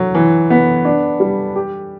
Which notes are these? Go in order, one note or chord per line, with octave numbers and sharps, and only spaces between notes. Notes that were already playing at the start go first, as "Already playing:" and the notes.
Already playing: F#3
E3
B3
D4
G3
G4